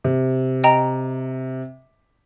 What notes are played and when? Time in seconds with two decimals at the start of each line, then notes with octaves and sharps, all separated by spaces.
0.04 C3
0.64 D#5 G5 A#5